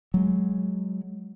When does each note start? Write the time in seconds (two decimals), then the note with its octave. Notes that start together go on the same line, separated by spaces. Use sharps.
0.14 F#3 G#3